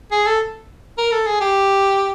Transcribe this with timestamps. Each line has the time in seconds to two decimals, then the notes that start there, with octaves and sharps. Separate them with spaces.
0.12 G#4
0.27 A4
0.98 A#4
1.12 A4
1.26 G#4
1.41 G4